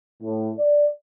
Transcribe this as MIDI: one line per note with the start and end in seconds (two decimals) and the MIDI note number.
0.23 0.50 45
0.59 0.87 74